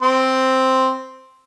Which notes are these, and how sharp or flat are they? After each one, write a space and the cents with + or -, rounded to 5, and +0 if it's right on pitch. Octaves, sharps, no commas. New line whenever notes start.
C4 +0 C6 +0